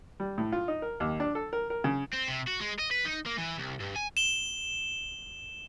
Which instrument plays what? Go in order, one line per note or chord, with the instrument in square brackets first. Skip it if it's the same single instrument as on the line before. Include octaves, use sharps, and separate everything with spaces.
[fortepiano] G3
A2
F4
D#4
A#4
D#2
D4
A4
A#4
A#4
C#3
[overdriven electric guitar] C4
C3
F#4
G#3
D#5
B4
D#4
A#3
E3
C2
G2
G#5
[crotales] E7 G7